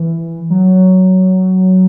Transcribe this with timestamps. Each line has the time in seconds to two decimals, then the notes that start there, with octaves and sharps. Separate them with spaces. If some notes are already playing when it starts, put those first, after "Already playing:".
Already playing: E3
0.50 F#3